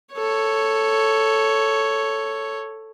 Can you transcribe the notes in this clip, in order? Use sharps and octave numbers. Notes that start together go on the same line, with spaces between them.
A4 C#5